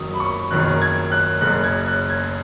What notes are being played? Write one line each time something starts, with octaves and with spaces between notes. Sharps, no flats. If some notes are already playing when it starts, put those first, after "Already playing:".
Already playing: F#1 F#2 D#3 F#3 D#6
B5
C#6
F#1 F#2 D#3 F#3 F#6
G#6
F#6
F#1 F#2 C#3 F#6
G#6
F#6
G#6